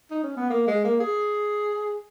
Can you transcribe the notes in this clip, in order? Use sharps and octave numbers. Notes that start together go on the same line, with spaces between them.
D#4
C#4
B3
A#3
G#3
A#3
G#4